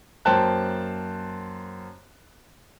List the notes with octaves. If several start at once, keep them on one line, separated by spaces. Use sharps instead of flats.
F#2 A#3 C5 G5 A5 F#6